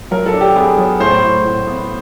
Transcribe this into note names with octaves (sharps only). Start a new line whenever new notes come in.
F#3 A#4
A4
D4
G4
B3 G#4
F#3
A2 C5
A2
A2
B3